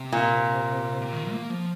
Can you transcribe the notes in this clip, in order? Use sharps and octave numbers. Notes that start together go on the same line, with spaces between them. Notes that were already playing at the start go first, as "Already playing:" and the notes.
Already playing: C3
A#2
C3
D#3
A#3
F3